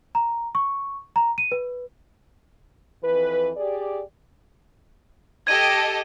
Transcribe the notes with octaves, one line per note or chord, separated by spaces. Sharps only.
A#5
C#6
A#5
D#7
B4
F2 E3 B4
G4 G#4 D5
G4 A4 D#5 G#6 D#7